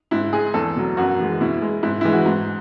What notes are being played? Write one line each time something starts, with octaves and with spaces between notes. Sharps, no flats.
G#2 E4
G#3 G#4
E2 A4
B2 F#3
F#2 F#4
E3 G#3
B2 E4
G#3
G#2 E4
E3 G#3 E4
F#4
G#2